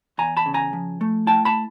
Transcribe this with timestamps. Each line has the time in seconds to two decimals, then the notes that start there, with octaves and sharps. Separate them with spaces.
0.18 E2 G#5 A#5
0.37 A5 B5
0.46 C#3
0.54 G#5 A#5
0.73 F3
1.01 A3
1.27 E4 G5 A5
1.45 A5 B5